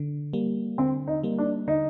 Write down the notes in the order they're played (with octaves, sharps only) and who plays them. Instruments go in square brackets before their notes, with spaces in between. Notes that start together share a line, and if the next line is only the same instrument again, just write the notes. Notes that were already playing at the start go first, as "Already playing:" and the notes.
Already playing: [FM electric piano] D3
G3 A#3
[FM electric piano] D3 [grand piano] C4
[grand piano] D#4
[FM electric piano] G3 A#3
[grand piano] D4
[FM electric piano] D3 [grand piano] D#4